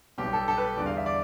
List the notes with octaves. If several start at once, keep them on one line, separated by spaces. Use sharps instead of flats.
B1 B2 G3 G4
A4
A4
B4
E2 D3 G3 D5
F5
E5
D5